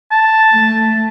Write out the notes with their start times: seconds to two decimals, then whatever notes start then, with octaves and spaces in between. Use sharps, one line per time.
0.12 A5
0.54 A3